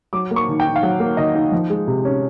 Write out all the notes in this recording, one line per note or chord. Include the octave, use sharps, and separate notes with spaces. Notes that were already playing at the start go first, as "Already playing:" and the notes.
F#3 D6
A#3
C#6
D#3
G5
D#4
F5
F#3 F#5
A#3
D#3 D#5
D#4
F3
G#3
C3
C#4